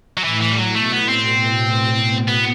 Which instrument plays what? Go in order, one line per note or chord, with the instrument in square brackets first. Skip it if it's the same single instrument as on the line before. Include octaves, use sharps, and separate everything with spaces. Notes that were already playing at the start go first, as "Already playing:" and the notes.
[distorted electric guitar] F#3
[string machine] A2 [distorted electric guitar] E3
[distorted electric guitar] E3
G3
F#3
[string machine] B2 [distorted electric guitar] A3
[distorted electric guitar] B3
C4
B3